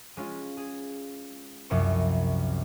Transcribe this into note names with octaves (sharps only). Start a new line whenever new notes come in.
G#3 C#4 F4
G#4
C2 F#2 F3 C#6